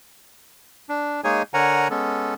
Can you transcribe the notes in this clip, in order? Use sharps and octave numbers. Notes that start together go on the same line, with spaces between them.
D4
G#3 A#3 D#4 G#4 C#5 G#5
D3 A#4 C#5 F#5 G#5 A#5
G#3 B3 C#4 A4